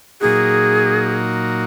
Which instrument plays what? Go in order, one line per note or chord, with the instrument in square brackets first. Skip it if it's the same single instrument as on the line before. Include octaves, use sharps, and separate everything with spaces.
[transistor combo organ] A#2 F#3 A#3 D#4 F#4 [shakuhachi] G#4